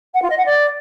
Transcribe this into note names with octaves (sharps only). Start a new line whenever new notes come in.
F#5
F4
D#5
F#5
D5